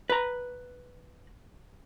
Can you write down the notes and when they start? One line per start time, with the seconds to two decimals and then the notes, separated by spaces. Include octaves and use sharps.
0.10 B4 A#5